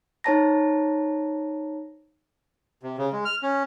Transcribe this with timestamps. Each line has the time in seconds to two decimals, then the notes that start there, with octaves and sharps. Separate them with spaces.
0.24 D#4 C5 C#5 A5 A#5 A#6
2.83 C3
2.98 C#3
3.13 G#3
3.25 F6
3.43 C#4